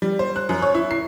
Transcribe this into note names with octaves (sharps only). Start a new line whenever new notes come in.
G3
C5
F#6
F#2
C#5
E4
C7